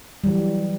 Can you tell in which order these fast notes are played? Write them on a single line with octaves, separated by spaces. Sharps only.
G3 E3 F#3